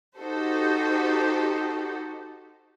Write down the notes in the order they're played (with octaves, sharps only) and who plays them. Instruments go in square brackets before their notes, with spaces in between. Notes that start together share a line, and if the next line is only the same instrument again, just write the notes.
[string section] D#4 F#4 G4 A4 C5